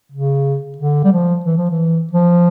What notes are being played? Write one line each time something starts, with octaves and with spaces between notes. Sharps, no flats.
C#3
D3
G3
F3
E3
F3
E3
F3